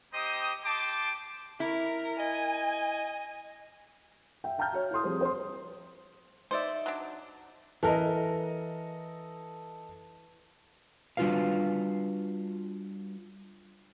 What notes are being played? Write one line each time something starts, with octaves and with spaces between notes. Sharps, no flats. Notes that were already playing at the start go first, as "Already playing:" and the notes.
C4 D#4 G4 C5 D#5 D#6
G4 G5 A5 C6 D6
E4 A#4
D#5 G#5
E5 G5
F5 G5 A5 A#5 F6 G6
F#4 C#5
E4 A4 C6 D#6
F3 G3 C4 G#4 C5
C5 C6
D#4 C5 D5 E5
F#3 D4
E3 A4 A#4 D#5
G3 D4 F4 F#4 B4 F5